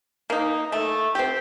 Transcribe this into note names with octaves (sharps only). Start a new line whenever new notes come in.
A#3 D#4
A3
C4 G4